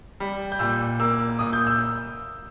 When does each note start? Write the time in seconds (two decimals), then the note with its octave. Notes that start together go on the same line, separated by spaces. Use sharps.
0.20 G3
0.52 G6
0.59 A#2 E6
1.00 A#3 E6
1.39 A#2 D#6
1.53 G6
1.67 E6